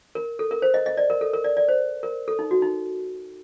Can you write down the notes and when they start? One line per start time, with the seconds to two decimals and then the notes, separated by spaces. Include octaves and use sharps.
0.15 A#4
0.39 A4
0.51 A#4
0.62 C5
0.74 D#5
0.86 D#5
0.97 D5
1.10 A#4
1.21 A4
1.33 A#4
1.44 D5
1.57 D5
1.68 C5
2.03 A#4
2.28 A4
2.39 D#4
2.51 F#4
2.62 D#4